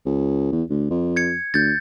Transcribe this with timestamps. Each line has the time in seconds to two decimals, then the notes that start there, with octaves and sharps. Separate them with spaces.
0.05 C#2
0.52 E2
0.70 D2
0.90 F2
1.16 G#6 C#7
1.54 D2 G6 A6